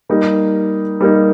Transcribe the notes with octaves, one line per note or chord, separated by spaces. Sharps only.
G3 A#3 D#4
G3 A#3 D#4